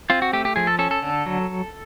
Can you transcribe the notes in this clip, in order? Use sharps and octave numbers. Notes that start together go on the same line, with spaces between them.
C4 F4
F#4
A3 G4
G4
F3 G#4
A4
C#4 A4
A4
D3
F#3